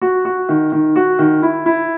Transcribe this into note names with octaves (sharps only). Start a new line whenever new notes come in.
F#4
F#4
D#3
D#3
F#4
D#3
E4
E4